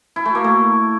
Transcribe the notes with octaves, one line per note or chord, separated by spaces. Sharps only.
E4
A3
A#3
A3